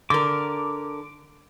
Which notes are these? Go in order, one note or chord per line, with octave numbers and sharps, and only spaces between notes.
D3 A#4 D6